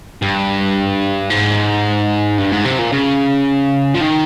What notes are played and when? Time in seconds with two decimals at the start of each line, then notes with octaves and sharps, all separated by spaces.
0.22 G2
1.30 G#2
2.38 G2
2.52 G#2
2.65 C3
2.79 A#2
2.93 C#3
3.94 F3
4.00 D#3